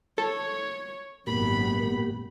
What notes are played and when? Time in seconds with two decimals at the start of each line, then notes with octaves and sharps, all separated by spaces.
0.18 A4 C#5
1.27 G#1 F#2 A#2 A#3 B3 G4 B5